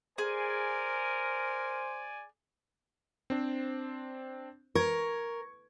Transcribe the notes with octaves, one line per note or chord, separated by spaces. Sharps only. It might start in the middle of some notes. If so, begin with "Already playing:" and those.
G#4 A#4 C5 D5 G#5
C4 D4 C5
A#4 C#6 G#6